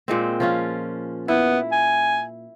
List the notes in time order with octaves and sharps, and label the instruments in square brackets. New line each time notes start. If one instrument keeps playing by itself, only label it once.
[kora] A#2 G#3 C4
F3 C#4 F4
[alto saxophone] B3 [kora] E4
[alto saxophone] G#5